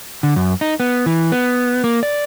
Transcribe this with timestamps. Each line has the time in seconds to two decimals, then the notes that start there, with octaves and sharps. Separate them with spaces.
0.23 D3
0.36 F#2
0.61 D#4
0.80 B3
1.06 E3
1.32 B3
1.84 A#3
2.03 D5